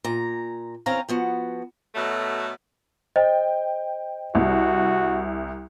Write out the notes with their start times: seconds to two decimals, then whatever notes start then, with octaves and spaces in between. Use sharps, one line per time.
0.04 A#2 A#5
0.86 E2 C4 C#4 F5 A#5
1.09 F3 B3 F#4
1.95 B2 F#3 A3
3.16 C5 D#5 G5
4.35 C2 F#4